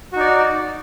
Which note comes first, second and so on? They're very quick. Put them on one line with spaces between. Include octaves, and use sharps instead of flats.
F#4 D#4 D5